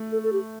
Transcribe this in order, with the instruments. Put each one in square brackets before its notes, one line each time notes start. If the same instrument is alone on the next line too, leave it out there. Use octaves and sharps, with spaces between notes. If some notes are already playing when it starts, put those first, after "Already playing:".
Already playing: [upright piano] A3
[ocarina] A4
A4
G4